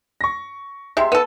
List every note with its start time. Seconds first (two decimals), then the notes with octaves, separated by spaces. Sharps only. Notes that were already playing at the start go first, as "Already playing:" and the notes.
0.21 C#6 A#6
0.97 C3 G#3 E5 C6
1.12 B3 A4 D#7